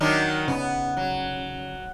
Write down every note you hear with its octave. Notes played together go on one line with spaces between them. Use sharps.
D#3 F#3 D4
C#3 B3
F#3